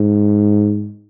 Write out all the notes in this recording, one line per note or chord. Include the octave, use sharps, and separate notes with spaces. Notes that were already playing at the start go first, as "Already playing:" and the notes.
Already playing: G#2